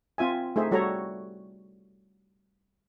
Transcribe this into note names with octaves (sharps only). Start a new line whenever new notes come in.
C4 F4 E5 G#5
A3 D#4 G#4 C5 E5
G3 F#4 A4 C#5 A#5